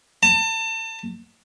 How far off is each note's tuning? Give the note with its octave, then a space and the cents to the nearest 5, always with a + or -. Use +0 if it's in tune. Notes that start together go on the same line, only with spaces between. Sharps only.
A5 +30